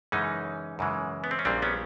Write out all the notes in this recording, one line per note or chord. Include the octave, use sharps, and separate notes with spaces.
F#2 C#3 E3 G#3 C#4 D#4
F#2 C#3 E3 G#3
B3
C4
C#4
A#1 A#2 G3 C4 D4
B3 C#4